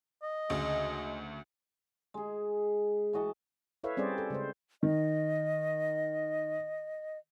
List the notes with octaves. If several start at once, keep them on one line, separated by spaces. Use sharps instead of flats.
D#5
D2 C#3 G#3
G#3 G#4
E3 F#4 D#5 A5
E4 A4 B4 C#5 E5 F5
G3 C4 C#4 G#4 C5 D5
A4
C#3 G#3 C5
D#3 D#5